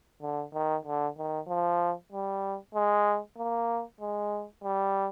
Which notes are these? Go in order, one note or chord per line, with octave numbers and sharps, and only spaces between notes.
D3
D#3
D3
D#3
F3
G3
G#3
A#3
G#3
G3